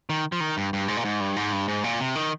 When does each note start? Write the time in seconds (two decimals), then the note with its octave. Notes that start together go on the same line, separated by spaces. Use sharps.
0.10 D#3
0.32 F3
0.40 D#3
0.57 G2
0.73 G2
0.88 G#2
0.97 A#2
1.05 G#2
1.20 G2
1.36 G#2
1.53 G2
1.68 G#2
1.84 A#2
2.00 C3
2.16 D#3